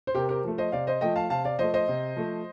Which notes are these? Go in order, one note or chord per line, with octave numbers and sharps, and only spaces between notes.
C5
C3 G4 A#4
G4 A#4
F3 A3
C5 D#5
C3 D5 F5
C5 D#5
F3 A3 D#5 G5
F5 A5
C3 F5 A5
D5 F5
F3 A3 C5 D#5
C5 D#5
C3
F3 A3